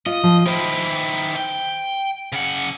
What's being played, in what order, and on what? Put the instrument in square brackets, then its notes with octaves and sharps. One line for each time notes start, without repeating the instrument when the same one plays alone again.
[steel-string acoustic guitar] F4 [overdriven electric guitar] D#5
[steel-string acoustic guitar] F3
[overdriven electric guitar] D#3 E4 [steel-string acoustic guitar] C5
[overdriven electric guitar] G5
C#3 F#5